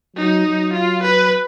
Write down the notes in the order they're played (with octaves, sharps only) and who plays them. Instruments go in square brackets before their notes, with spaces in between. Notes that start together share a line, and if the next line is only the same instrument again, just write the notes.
[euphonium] F#3 [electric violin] D#4
[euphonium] F#3
[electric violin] F4
B4